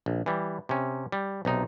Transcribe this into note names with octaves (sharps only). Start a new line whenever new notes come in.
A#1
E3 G3
C3 C#4
G3
B1 C3 D#4